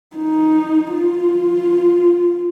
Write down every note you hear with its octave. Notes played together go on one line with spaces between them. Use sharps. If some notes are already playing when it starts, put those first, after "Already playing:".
D#4
F4